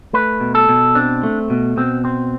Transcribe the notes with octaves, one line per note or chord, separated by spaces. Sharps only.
A3 B4
B2
A4
B2
C4 D4
A3
B2
B2 C4
C4